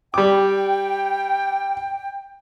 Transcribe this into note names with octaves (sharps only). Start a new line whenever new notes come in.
G3 G5 D6